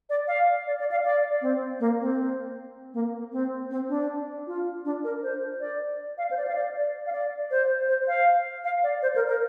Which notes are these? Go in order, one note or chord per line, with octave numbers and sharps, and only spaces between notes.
D5
F5
D5
D5
F5
D5
C4
A#3
C4
A#3
C4
C4
D4
F4
D4
A#4
C5
D5
F5
C5
D5
F5
D5
D5
F5
D5
C5
C5
F5
F5
D5
C5
A#4
A#4